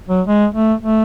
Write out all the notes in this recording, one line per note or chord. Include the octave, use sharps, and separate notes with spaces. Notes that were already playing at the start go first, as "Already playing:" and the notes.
F#3
G#3
A3
A3